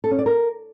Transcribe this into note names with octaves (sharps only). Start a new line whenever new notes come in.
A4
C#4
D5
A#4